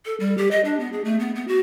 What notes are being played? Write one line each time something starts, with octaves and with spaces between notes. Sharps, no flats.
A4
G3
G4
D#5
D4
B3
G#4
A3
B3
B3
F#4